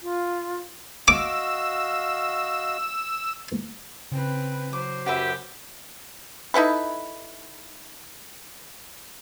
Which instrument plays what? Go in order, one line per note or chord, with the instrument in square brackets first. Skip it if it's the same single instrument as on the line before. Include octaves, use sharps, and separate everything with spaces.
[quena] F4
[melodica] F#4 D#5 F5 [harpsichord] D6 [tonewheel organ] E6
[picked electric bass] C#3 [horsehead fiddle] C4 B4
[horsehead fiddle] F#3 C5 [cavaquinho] D6
[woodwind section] F#2 G4 [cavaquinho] F#4 B4 E5
[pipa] D#4 E4 A4 B4